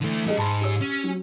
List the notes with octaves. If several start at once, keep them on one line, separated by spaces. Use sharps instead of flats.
D3 E3 A3
G3 C#4 G#4 D#5
G#2 A5 B5 C6
G4 C#5 E6
C#4
F#3